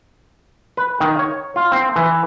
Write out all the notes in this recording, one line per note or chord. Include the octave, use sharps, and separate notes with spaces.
B4
D#3
C#5
F4
C4
E3